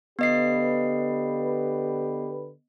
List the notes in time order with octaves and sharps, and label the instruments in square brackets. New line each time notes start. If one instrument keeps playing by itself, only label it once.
[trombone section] D3 G4 B4 [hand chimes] B3 D#5 C7